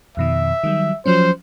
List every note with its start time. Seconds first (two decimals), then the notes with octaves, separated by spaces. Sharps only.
0.17 F2 B2 D#3 E5
0.64 D#3 F#3 G3
1.06 F3 F#3 C#4 C5